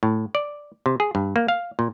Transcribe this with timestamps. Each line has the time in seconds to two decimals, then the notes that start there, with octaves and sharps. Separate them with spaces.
0.03 A2
0.35 D5
0.86 C3
1.00 G#4
1.15 G2
1.36 A#3
1.48 F5
1.79 A#2